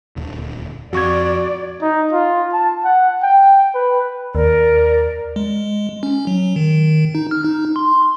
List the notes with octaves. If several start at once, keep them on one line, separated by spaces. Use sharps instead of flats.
D#1 D2
F2 F#4 D5 C#6 G#6
D#4
F4
A5
F#5
G5
B4
D#2 A#4 D5
G#3
C#4
F#3
D#3
D#4
F6
D#4
C6